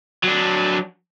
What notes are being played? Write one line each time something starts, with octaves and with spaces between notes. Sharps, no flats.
F#3 D4